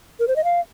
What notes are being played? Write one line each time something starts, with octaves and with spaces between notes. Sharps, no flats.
A#4
C5
D#5
F5